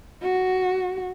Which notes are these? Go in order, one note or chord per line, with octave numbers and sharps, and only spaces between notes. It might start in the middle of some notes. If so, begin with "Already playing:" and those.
F#4